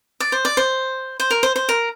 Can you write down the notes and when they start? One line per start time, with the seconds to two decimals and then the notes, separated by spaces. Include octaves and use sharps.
0.20 D5
0.32 C5
0.45 D5
0.57 C5
1.20 C5
1.31 A#4
1.43 C5
1.56 C5
1.69 A#4